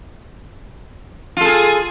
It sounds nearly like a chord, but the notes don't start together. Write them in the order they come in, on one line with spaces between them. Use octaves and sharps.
F4 A4 G#4